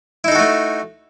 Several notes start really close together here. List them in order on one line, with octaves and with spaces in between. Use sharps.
E4 D#4 A4 F#4 A3